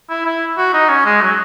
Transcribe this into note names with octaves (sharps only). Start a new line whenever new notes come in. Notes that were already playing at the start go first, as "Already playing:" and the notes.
E4
E4
F#4
D#4
C#4
G#3
F#3